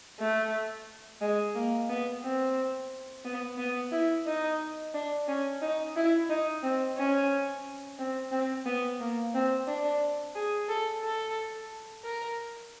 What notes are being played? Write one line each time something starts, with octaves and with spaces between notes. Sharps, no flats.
A3
G#3
A#3
B3
C4
B3
B3
E4
D#4
D4
C#4
D#4
E4
D#4
C4
C#4
C4
C4
B3
A#3
C4
D4
G#4
A4
A4
A#4